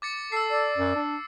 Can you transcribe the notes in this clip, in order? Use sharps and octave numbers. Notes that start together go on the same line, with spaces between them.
D6 A6 C#7
A4 E6 C7
D5
F#2
D4